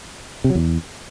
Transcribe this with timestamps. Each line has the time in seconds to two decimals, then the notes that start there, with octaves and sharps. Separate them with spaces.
0.44 C3
0.50 F#3
0.55 E2